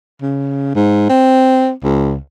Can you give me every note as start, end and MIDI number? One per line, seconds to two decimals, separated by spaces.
0.22 0.71 49
0.75 1.07 44
1.09 1.71 60
1.84 2.16 37